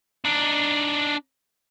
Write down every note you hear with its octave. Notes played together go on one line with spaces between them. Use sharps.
D4 D#4